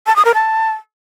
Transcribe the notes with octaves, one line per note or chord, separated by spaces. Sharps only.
A5
D#6
A#4
A5